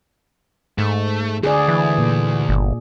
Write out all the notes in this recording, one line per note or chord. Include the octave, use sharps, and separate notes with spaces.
G#2 A3
D2 G#4 D5
E3
A#2
G1